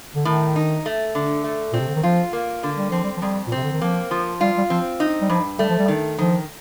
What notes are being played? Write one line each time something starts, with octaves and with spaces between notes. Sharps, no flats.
D3
A2 D#3
D#4
A3
D3
A3
A#2 C4
C3
D3
D#3
F3 F4
A#3
D3
G3
F3 C4
G3
F3
F2 G3
A#2
C3 C4
D3
D#3
F3 A#3
F3
G3 F4
G3
F3 C4
D#4
G3
G2 F3
G3 A3
F3
G3
D#3
D#3 F3